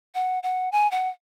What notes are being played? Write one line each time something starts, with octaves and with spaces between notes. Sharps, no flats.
F#5
F#5
G#5
F#5